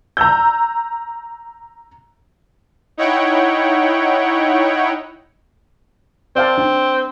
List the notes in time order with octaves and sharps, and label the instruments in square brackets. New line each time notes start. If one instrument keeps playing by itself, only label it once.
[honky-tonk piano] A#5 E6 G6
[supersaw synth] D#4 E4 C#5 F#5 G5
[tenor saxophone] C4 [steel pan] D5 F5 A5
[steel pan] D4 G5